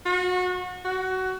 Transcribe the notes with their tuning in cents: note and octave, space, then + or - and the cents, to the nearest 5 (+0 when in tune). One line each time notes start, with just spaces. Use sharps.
F#4 -30
F#4 +20